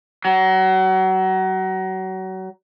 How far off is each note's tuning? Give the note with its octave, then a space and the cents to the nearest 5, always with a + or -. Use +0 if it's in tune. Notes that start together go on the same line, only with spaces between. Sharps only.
F#3 +30